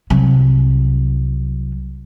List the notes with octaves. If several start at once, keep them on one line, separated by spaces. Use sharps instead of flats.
C2 F#3